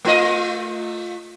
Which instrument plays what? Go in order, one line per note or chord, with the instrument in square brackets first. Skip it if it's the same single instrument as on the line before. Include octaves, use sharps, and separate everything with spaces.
[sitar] A3 F4 D#5